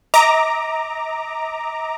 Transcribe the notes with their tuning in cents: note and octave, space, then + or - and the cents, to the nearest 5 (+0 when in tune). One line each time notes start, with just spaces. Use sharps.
D#5 +45 A#5 +0 D6 +5